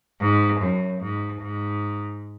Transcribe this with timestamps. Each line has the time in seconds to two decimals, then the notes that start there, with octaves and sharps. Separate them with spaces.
0.21 G#2
0.61 F#2
1.01 G#2
1.42 G#2